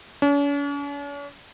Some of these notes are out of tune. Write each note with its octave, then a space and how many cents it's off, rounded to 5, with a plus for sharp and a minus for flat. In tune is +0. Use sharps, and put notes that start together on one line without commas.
C#4 +45